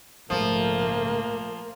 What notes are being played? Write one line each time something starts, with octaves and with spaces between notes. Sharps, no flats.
A#1 G#2 C#3 F3 A3 A#3